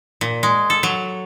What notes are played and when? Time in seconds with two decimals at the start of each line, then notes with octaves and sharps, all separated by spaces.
0.21 A#2
0.43 G#3
0.70 A4
0.83 F#3